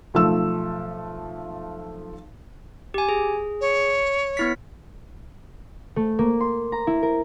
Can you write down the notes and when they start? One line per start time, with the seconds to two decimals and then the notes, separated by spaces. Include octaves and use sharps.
0.14 B1 F3 A3 E6
2.94 G4 G#5
3.09 G#4
3.61 C#5
4.37 B3 E4 B6
5.96 A3
6.19 A#3
6.40 C6
6.72 A#5
6.87 E4
7.02 A#4